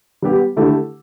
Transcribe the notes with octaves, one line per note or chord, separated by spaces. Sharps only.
G3 B3 G4
D3 A3 E4 G4